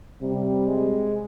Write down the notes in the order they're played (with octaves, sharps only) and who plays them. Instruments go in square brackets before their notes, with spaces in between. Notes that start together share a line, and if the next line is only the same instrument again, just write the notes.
[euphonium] C3 [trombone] G3
[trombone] G#3